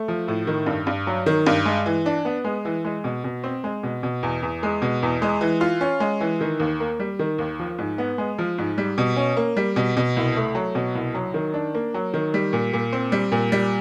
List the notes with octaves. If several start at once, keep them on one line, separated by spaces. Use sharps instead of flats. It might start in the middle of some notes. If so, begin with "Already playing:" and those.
Already playing: A3
F3
A2
D#3
G2
G2
F#3
D#3
G2
G#3
E3
D4
B3
G#3
E3
G#3
B2
B2
C4
G#3
B2
B2
E2
E2
G#3
B2
E2
G#3
E3
F4
C#4
G#3
E3
D#3
D#2
A#3
G3
D#3
D#2
F3
G#2
B3
G#3
F3
G#2
G3
B2
C#4
A#3
G3
B2
B2
C2
A3
F#3
B2
C2
F#3
D#3
D4
A#3
F#3
D#3
G3
A#2
A#2
C4
G3
A#2
G3